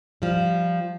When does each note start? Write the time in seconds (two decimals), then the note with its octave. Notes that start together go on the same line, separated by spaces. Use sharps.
0.22 F3 G3